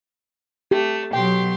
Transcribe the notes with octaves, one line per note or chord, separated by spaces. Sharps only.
A3 G4
B2 F#3 G4 G5 C6